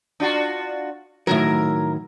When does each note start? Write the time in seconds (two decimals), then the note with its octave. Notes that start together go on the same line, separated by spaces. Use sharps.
0.20 D4 F4 F#4
1.27 A2 D#3 F#3 E4 A#4